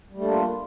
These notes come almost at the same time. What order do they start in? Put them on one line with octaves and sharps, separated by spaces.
G3 A3 D4 A#3 F4